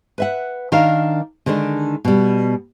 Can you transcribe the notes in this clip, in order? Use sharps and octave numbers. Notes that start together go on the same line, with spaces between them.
B4 E5 F#5
D#3 D4 A#4 F5
D3 D#3 G#3 C4 D4
B2 G3